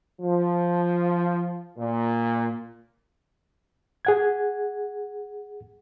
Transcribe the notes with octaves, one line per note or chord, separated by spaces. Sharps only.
F3
A#2
G#4 F#5 G#6